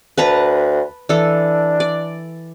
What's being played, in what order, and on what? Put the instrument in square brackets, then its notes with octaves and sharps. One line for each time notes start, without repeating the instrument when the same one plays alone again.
[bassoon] D2 [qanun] B4 A5 A#5
[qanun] E3 A4 [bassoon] D4
[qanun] D5